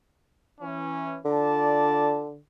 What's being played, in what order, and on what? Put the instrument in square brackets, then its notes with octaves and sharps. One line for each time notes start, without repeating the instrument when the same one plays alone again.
[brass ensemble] E3 C#4
[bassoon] D3 [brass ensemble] F4 D5 A5